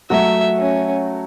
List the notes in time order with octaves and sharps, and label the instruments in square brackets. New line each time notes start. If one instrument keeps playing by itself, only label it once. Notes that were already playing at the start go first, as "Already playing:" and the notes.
[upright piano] F#3 A3 F#4 [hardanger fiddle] E5
[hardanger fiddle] C#4